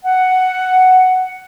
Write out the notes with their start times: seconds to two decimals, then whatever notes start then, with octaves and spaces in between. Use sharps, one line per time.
0.05 F#5